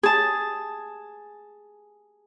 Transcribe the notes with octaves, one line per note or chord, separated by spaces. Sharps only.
G#4 A5